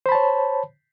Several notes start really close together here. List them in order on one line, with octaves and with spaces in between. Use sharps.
C5 B5 A5 C#5